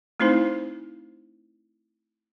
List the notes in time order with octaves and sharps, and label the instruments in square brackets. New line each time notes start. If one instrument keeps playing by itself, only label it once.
[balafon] A3 C4 D#4 E4 C5